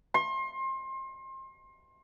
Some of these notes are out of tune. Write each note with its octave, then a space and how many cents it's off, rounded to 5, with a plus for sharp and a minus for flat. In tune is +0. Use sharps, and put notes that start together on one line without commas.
C6 +30